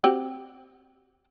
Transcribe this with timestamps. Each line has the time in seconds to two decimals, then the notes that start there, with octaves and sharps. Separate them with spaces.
0.04 C4 F#4 G4